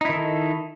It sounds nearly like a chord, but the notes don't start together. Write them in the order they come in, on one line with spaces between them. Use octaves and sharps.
D#4 E4 D#3 A4